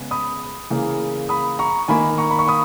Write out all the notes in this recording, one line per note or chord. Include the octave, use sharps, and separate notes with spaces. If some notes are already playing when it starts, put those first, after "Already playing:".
Already playing: C#3 G#3 B3
B5 D#6
C#3 E3 A#3
B5 D#6
A#5 C#6
D#3 A#3 G#5 B5
A#5 C#6
B5
C#6
B5 D#6